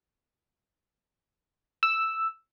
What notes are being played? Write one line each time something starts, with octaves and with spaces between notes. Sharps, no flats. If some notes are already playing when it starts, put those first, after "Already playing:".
E6